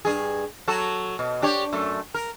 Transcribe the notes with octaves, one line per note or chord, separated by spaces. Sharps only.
G2 G#4
F#3 F#4 A4
B2
D4 G4 C#5
F#2 A3
A#4